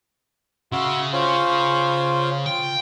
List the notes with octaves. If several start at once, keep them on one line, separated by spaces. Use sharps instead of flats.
C#3 F#4 E5 C6
C#4 F4 C5
F4 G5